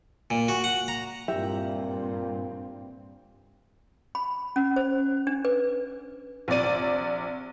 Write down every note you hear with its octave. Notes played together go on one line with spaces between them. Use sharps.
A#2
F#4
F#5
A#5
G2 A#2 C4 G4 E5
B5
C#4
C5
D4
B4
A#1 C3 D5 D#7